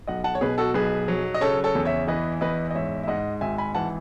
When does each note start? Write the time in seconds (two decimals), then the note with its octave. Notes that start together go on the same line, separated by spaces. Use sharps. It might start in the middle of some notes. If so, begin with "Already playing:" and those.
0.07 B1 D#5 F#5
0.24 F#5 A5
0.35 C#5
0.41 B2 G#4 B4
0.58 F#4 A4
0.74 B1 G#4 B4
1.08 F#3
1.34 D#5
1.41 C#3 A4 C#5
1.64 A4 C#5
1.75 E2
1.85 C#5 E5
2.08 E3 B4 D#5
2.41 E2 B4 D#5
2.71 D#5
2.75 G#2 C#5 E5
3.03 E5
3.08 G#2 D#5 F#5
3.41 G#1 E5 G#5
3.58 G#5 B5
3.75 E3 F#5 A5